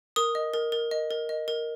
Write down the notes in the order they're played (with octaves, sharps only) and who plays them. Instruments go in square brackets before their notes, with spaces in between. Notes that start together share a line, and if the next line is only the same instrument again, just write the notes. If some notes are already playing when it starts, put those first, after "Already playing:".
[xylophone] A#4 D#6
D#5
A#4
A#4
D#5
A#4
D#5
A#4